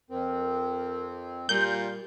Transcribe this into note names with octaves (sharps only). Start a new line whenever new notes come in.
F2 C4 A#4
A#2 G3 F4 G6